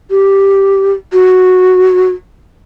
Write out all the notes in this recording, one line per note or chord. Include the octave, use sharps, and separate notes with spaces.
G4
F#4